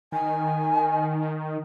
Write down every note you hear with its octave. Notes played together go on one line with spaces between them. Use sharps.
D#3 G#5